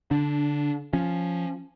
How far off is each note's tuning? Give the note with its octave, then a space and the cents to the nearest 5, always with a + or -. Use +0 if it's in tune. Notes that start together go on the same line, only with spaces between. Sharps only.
D3 -20 D4 +0
F3 +0 C#4 +0